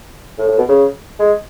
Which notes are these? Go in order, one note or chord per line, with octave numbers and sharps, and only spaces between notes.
A2
A2
B2
C#3
G#3